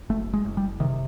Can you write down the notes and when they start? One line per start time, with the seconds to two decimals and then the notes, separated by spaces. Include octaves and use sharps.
0.10 F#1 A3
0.34 G#3
0.45 F#1
0.57 G3
0.80 C3 D#3